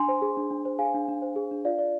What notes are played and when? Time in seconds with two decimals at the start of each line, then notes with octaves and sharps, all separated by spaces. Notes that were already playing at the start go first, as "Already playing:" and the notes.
Already playing: D4 G#5 C6
0.08 C5
0.22 G#4
0.37 D4
0.51 D4
0.65 C5
0.79 G#4 F5 G#5
0.94 D4
1.08 D4
1.22 C5
1.36 G#4
1.51 D4
1.65 F4 D5 F5
1.79 D5